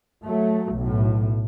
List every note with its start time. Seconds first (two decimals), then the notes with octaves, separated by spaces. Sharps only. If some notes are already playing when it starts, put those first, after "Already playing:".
0.25 F#3 A3
0.75 B1 A2